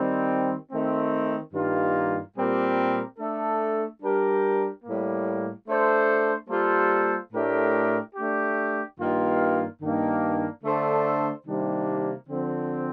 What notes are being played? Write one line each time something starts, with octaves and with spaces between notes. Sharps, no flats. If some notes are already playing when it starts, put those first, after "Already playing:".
Already playing: D#3 G3 C4
D#3 A3 C4
G2 D#3 G3 A#3 F4
A#2 G3 C4 G4 A#4
A3 D4 A4
G3 D4 G4 A#4
A2 G3 A#3
A3 D4 A4 C5
G3 A#3 F4 A4 C5
A2 A3 D4 G4 A#4
A3 D4 G4
G2 D#3 A#3 F4
G2 D#3 A#3 D4
D3 A3 D4 A4 C5
C3 D#3 G3 A#3 D4
D3 F3 C4